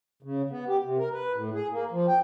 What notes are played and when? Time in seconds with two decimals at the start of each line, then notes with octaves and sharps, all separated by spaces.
0.23 C#3
0.50 B3
0.68 G4
0.83 C3
0.98 A#4
1.13 B4
1.34 A2
1.54 G#4
1.72 A#3
1.92 F3
2.08 G5